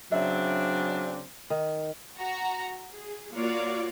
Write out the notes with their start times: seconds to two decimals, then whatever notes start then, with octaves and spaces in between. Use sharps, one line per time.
0.12 C#3 F#3 C4 D4 E5
1.50 D#3
2.17 F#4 A#5
2.91 G#4
3.33 A#3 F4 F#4 C#5 D5